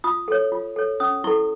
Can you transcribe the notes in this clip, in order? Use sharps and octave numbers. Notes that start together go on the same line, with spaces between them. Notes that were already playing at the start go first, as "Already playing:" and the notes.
F4 D#6
A4 C#5
F4
A4 C#5
C#4 D#6
E4 A4 C#6